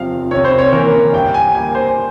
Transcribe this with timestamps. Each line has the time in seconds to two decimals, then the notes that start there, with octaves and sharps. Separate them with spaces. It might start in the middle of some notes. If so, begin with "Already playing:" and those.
Already playing: E2 C3 F3 F5
0.31 C3 C#5
0.45 C5
0.58 C#5
0.72 E3 A#3 C#4 A#4
1.13 G2 G5
1.34 G#5
1.54 G3 A#3 G#5
1.75 C5